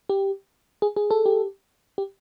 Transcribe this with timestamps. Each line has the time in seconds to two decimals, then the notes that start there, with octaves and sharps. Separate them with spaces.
0.09 G4
0.82 G#4
0.96 G#4
1.11 A4
1.26 G4
1.98 G4